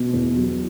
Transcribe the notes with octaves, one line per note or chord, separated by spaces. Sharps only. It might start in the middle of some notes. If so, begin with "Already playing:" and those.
Already playing: B2
E2
F#3